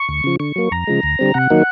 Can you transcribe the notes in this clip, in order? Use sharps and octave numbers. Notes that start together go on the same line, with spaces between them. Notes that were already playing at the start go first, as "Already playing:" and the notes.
Already playing: C#6
D2
C#3 F3
D3 C#6
F#3 A#3
F2 A#5
C#3 F3 G#3
D2
D3 G3 C4
C3 F#5
D#3 F#3 A#3 D#4